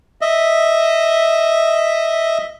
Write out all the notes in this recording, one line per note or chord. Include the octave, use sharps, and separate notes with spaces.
D#5 E5